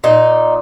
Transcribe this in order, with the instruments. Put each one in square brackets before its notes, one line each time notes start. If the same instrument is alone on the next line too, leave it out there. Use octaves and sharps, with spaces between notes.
[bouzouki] A#2 D#4